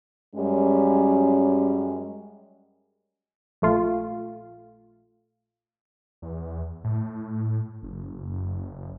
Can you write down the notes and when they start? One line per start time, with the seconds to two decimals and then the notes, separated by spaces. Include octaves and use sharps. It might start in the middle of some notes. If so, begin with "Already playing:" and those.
0.36 F#2 G3 G#3 C#4
3.62 A#1 A3 F4
6.22 E2
6.84 A2
7.82 F#1